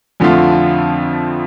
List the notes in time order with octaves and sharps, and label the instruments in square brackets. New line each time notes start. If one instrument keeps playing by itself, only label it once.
[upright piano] F2 D3 F3 A3 F4